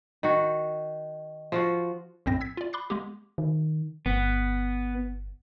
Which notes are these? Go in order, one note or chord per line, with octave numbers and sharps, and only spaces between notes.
D#3 F#4
F3 F4 F#4
A#1 F#2 A2 C4 A#6
E6 G#6 B6
F4 D5
B5 C6 D6 F#6 A6 C7
G#3 A#3 B3 G4
D#3
G1 B3